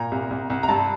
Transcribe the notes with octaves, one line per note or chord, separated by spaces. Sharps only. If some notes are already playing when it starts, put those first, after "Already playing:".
Already playing: A#2 A#5
C2
C2
C2
A#5
G2 A5